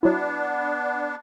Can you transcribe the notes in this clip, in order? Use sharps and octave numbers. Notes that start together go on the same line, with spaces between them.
F#3 B3 D4 E4